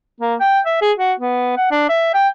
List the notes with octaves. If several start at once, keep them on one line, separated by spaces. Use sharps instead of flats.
A#3
G5
E5
G#4
F#4
B3
F#5
D4
E5
G5